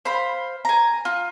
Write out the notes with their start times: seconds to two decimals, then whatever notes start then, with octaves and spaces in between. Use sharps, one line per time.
0.05 C5 F5 B5
0.65 G#5 A#5
1.05 F4